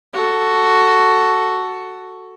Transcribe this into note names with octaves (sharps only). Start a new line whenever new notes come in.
F#4 A4